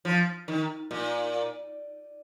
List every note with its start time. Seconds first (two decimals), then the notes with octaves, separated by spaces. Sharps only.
0.05 F3
0.48 D#3
0.91 A#2